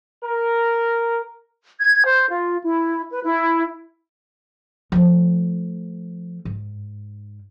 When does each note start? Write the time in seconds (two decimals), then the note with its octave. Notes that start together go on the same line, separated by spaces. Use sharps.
0.23 A#4
1.79 G#6
2.04 C5
2.29 F4
2.64 E4
3.10 B4
3.25 E4
4.92 F3 A3
6.45 G#2